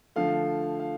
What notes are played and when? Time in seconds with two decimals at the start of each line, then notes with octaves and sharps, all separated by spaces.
0.16 D3 F3 A3 F5
0.80 F5